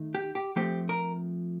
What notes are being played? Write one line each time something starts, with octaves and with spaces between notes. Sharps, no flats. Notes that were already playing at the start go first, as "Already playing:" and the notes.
Already playing: D#3 A3 D#4
G4
G4
F3 A3 C4 G4
A#4